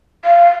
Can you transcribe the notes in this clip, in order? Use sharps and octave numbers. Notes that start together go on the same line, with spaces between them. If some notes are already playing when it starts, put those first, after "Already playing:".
F5